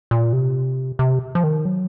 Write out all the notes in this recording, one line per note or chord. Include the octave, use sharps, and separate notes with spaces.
A#2
C3
C3
F3
D#3
F#3